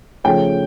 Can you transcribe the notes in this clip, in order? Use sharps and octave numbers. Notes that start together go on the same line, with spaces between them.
C#3 F3 A3 C#4 G5